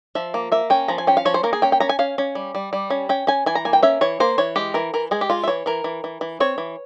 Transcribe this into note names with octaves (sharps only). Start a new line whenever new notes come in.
F3 E5
A#3
A#3 E5
C#4 G5
F3 A#5
G#5
C#4 G5
F5
F3 C#5
C5
A#3 A#4
G#4
C#4 G5
G5
C#4 A#5
G#5
C#4 F5
C#4
G3
G3
G3
C#4
C#4 G5
C#4 G#5
E3 G#5
A#5
A#3 G#5
G5
C#4 E5
E3 C#5
A#3 C5
E3 C#5
G#3 G4
E3 A#4
E3 A#4
G#3 G#4
G4
G#3 F4
E5
E3 C#5
E3 A#4
E3
E3
E3
C4 C#5
E3